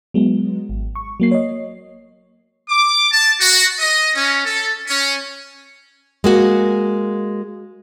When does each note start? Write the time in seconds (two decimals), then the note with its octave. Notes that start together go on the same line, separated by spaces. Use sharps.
0.14 F#3 G#3 B3
0.69 G#1
0.95 C#6
1.20 F#3 A#3 C7
1.31 C#5 D#5
2.69 D6
3.11 A5
3.40 F#4
3.79 D#5
4.14 C#4
4.44 A4
4.87 C#4
6.24 G#3 A#3 F#4